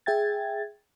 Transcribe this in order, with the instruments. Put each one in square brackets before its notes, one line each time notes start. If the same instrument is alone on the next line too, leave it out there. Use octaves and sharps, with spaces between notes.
[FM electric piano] G#4 E5 G5 G#6 A6